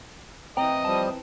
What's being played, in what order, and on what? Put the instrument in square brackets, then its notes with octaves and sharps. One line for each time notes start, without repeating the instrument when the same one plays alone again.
[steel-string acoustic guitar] E3 C4 [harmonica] D#5 [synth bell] G5 A#5
[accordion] F3 G3 D#6 [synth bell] A5